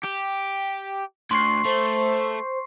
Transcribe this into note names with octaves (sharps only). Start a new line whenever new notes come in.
G4
D2 C6 C#6 C7
A3 C5